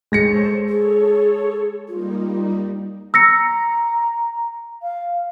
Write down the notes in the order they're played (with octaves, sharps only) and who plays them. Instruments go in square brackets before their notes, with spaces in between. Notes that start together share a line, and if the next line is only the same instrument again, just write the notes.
[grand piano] G#3 A#6 C#7 [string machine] A4 C5 C#5
[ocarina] G#4 [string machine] A4 C#5
[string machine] G3 A#3 D#4 [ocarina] F4
[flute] A#5 [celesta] E6 A#6 C#7
[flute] F5